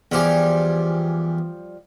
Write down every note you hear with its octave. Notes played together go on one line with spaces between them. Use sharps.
E2 F3 G3 G4 G#5